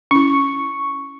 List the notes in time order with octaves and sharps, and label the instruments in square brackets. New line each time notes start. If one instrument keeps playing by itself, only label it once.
[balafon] C#4 E4 [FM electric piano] C#6